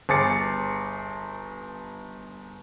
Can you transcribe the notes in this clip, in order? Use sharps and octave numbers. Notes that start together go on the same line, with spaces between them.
G1 G#4 D6 A6 C#7